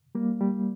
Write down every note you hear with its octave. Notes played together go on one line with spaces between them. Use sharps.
G3 A#3
G3